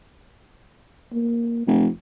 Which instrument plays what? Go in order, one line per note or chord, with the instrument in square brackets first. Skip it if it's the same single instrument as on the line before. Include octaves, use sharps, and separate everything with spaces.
[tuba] A#3
[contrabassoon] F1 [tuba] F3